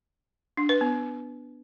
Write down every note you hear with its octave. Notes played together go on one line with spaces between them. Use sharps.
D4
B4
B3